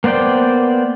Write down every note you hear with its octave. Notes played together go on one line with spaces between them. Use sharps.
A#3 B3 C5 D5 G5